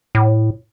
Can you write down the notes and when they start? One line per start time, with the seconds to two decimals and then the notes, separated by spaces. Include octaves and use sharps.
0.15 A2